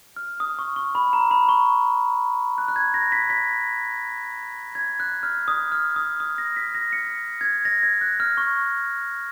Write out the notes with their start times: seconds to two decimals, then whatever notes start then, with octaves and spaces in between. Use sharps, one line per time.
0.16 F6
0.40 D#6
0.59 C#6
0.76 C#6
0.95 B5
1.13 A#5
1.31 B5
1.49 C#6
2.58 F#6
2.68 F#6
2.76 G#6
2.94 A#6
3.12 B6
3.30 B6
4.75 G#6
5.00 F#6
5.23 F6
5.48 D#6
5.72 F6
5.96 D#6
6.20 D#6
6.38 A#6
6.57 B6
6.75 A#6
6.93 C#7
7.41 G#6
7.65 A#6
7.83 G#6
8.01 F#6
8.20 F6
8.37 C#6